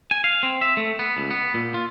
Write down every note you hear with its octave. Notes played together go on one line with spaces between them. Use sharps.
G#5
F5
C4
E5
A3
B3
C#2
B3
A#2
F4